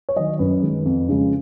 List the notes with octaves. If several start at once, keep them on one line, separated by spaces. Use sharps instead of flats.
C#5
D#3 F#3 D#5
F#2 B4
D#3 G#3
F2
C#3 F3 G#3